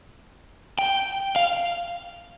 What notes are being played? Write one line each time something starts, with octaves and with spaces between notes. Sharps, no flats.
G5
F5